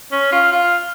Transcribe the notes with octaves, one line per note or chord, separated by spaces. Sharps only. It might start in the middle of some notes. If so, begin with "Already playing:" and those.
C#4
F4
F4